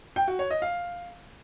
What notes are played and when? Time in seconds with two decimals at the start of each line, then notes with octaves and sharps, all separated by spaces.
0.16 G5
0.28 F#4
0.39 C#5
0.50 D#5
0.62 F5